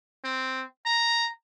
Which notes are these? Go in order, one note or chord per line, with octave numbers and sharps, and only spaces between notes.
C4
A#5